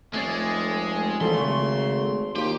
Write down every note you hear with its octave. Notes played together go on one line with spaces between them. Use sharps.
F1 G#3 A3 C#4 D5
G#1 E3 F3 G3 A4 C6
C#3 A3 C#6
D#2 F4 G4